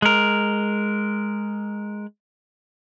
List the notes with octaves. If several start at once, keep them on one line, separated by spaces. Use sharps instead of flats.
G#3 A#4